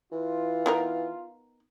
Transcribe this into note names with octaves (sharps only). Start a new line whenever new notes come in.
E3 F4
B3 D#4 A#4